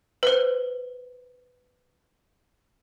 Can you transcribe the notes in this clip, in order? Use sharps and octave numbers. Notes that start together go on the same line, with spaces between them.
B4 C5